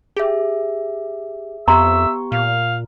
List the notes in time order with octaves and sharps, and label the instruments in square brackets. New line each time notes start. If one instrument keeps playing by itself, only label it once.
[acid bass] G4 [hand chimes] G#4 E5
[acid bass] F2 [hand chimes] B3 G4 C#6 [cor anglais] E5 [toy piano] A#5 C6
[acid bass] A#2 [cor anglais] F5